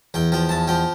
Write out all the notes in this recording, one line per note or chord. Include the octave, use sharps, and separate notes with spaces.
E2 G5
F3 G5
E2 A5
F3 G5